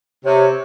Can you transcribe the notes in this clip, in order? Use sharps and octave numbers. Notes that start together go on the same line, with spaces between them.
C3 C#5